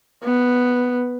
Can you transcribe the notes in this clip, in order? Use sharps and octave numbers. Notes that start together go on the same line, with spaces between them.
B3